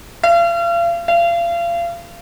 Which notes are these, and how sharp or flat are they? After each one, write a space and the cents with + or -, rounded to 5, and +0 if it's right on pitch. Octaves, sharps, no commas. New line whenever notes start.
F5 -40
F5 -35